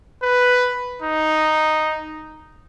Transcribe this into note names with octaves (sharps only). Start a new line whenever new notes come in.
B4
D#4